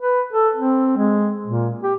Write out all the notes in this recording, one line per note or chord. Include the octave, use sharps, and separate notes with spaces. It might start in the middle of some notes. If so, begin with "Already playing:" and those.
B4
A4
C4
G#3
A#2
G4